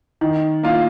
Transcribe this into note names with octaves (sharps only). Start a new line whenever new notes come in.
D#3
A#3 F4